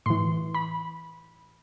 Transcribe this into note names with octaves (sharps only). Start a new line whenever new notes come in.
A2 E3 C6
B5